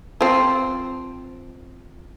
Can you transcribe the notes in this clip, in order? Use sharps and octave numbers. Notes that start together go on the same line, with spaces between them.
F3 C4